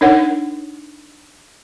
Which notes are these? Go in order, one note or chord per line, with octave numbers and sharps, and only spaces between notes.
D4 D#4 A#4 C#5 F#5